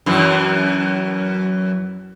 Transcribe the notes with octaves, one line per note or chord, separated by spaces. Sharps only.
F#2 E3